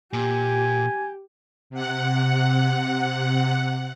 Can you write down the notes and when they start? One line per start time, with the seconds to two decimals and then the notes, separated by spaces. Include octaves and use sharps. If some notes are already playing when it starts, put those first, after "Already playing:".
0.13 A#2 G4 G#5
1.70 C3 F#5